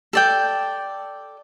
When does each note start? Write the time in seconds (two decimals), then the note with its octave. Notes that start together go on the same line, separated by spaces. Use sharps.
0.13 A4 D5 G5